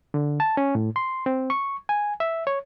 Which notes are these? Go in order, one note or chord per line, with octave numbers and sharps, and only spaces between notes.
D3
A5
C#4
A2
C6
C4
C#6
G#5
E5
C#5